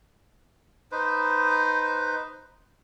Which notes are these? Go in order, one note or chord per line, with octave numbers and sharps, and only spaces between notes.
D#4 B4 C5